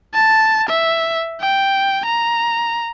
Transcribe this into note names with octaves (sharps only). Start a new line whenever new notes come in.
A5
E5
G5
A#5